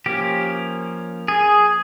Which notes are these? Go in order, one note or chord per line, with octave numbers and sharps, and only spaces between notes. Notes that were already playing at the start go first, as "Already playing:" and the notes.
F3 A#3 C#4 G4
G#4